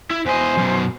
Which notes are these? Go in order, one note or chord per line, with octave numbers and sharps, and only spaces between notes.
E4
E2 C5 D#5 G#5
F#2 B2